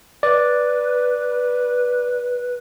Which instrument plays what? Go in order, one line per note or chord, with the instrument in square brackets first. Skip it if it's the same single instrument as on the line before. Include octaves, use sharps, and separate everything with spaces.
[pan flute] B4 [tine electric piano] D5